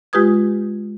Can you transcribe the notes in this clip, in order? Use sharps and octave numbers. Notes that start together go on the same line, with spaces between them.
G#3 F4 G4 B4 D#6 G#6